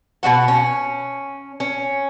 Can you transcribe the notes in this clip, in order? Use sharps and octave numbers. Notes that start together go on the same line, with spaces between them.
B2 G3 F#4 F#5
C#4
C#4